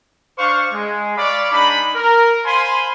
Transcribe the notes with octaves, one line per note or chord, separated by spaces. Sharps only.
D4 C5 F5 C#6
G#3
C#5 D5 F5 B5 D6
G#3 D4 D#4 B5
A#4
C5 F5 G#5 B5 C6